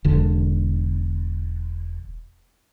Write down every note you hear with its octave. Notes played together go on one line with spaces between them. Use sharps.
E1 D3